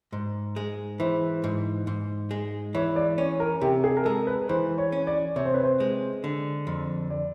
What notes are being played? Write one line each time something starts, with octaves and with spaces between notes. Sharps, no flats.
G#2
G#3
E3 C5
G#2
G#2
G#3
E3 C#5
D5
C#4 C#5
A#4
C3 G4
G#4
A#4
G#3 A4
B4
E3 C5
C#5
C#4
D5
C3 C#5
C5
B4
C5
G#3
D3
F2
D5